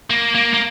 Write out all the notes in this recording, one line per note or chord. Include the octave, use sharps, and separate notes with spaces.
A#3
A#3
A#3